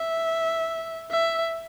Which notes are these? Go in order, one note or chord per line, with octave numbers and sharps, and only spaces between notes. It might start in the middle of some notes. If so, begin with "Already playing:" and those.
Already playing: E5
E5